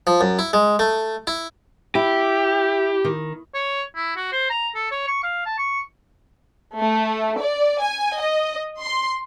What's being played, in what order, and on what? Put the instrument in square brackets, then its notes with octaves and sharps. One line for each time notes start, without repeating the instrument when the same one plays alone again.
[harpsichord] F3
F#2
E4
G#3
A3
E4
[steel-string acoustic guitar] E4 [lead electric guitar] G4
[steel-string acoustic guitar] D#3
[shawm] C#5
E4
F#4
C5
A#5
A4
C#5
C#6
F5
A5
C#6
[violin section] A3
D5
G#5
D#5
C6